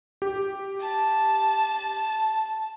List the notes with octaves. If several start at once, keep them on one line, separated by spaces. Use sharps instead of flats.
G4
A5